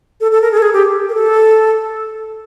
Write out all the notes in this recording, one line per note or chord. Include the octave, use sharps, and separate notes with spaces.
A4
A4
A#4
G#4
A4
G#4
G4
A#4
A4